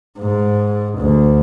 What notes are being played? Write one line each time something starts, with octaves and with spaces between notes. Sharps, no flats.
G#2
D2